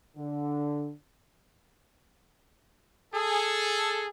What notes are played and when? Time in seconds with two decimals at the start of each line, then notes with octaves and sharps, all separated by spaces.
0.17 D3
3.14 G#4 A4